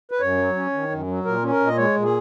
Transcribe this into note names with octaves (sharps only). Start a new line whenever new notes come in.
B4
F#2 C#5
F#3
C#4
D#3
F#2
F#3
A#2 A#4
C#4
A#4
A#2
D#5
G#3 C#5
A#2
G#4